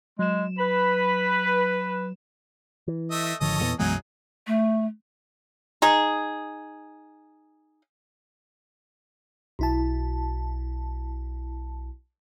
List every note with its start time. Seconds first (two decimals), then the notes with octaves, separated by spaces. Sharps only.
0.19 F#3 G#3 E7
0.58 B4 B5
2.88 E3
3.11 A3 D#5 E5
3.41 G#1 D3 F3 A4 C#5 D#5
3.60 E2 A#2 E3 G3 B3
3.79 B1 F#2 E3 F#3 G#3 B3 D#4 G#4
4.47 A3
5.82 D#4 G#4
9.59 B1 E4 A5